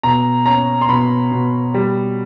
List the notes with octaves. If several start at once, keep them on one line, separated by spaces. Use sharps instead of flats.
B2 A#5
C#4 A#5
C6
B2 B5
B2
G3